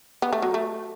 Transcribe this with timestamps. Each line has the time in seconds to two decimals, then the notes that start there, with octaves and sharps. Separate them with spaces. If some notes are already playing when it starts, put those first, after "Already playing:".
0.22 B3
0.33 A3
0.42 F#3
0.54 A3